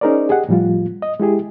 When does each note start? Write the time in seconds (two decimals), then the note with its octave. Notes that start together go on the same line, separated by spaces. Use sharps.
0.01 C#4 D#4 G#4 A#4 C5 D5
0.29 G4 G#4 D#5 F#5
0.49 A2 F3 G3 F4
1.02 D#5
1.20 G#3 E4 G4 G#4